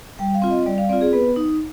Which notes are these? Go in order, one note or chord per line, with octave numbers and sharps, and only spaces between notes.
G3 G5
F5
C4 F4
D#5
G3 D5
F5
C4 F4 D5
G#4
B3 B4
D#4